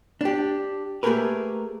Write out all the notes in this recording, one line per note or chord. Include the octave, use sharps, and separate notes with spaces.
D4 G4
A3 A#3 G4 G#4 A#4 B4